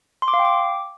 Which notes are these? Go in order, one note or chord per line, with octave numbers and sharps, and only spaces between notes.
C6
D6
F5
G5
D6